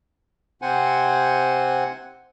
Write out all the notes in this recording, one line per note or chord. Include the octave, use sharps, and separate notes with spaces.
C3 C4 C5 F#5 G#5